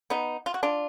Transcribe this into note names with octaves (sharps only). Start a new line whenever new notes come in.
B3 D#4
F4
F#4
D4 F4